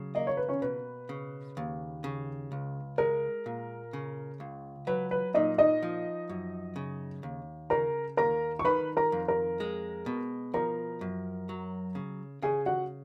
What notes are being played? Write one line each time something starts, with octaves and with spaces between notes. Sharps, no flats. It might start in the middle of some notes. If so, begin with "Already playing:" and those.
Already playing: C#3 F#3
A#3 D#5
C#5
B4
C#4 C#5
B2 B4
C#3
D#2
C#3
C#2
G#3 A#4
A#2
C#3
C#2
F#3 B4
B4
A#2 D#4 D#5
D#4 D#5
F3
F#2
C#3
D#2
C#3 A#4 A#5
D#2 A#4 A#5
C#6
D#3 B4 B5
A#4 A#5
F2
A#4 A#5
G#3
B2
F3 A#4 A#5
F#2
F#3
C#3
C#3 G#4 G#5
F#4 F#5